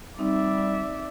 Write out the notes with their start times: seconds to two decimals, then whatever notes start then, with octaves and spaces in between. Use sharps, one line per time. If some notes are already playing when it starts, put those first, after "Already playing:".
0.19 G3 C4 D#4 D5 E5